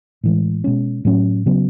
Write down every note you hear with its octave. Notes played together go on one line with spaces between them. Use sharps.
A2 E3 G#3
B2 G#3 C#4
A2 F#3 C#4
C#3 F#3 B3